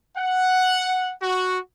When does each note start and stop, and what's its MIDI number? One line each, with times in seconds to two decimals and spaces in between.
0.17 1.12 78
1.22 1.59 66